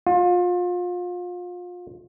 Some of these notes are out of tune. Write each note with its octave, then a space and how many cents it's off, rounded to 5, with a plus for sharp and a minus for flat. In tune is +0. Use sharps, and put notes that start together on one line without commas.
F4 +30